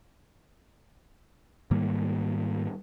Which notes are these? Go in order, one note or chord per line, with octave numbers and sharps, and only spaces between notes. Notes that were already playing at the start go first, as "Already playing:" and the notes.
G#2 D#3 G3 A#3